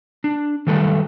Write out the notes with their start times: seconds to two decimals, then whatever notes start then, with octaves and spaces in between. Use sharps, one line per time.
0.24 D4
0.67 D#3 F#3 G3 A3 A4 B4